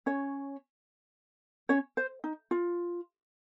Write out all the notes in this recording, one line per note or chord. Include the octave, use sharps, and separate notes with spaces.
C#4 C#5
C#4 C#5
C5
D#4
F4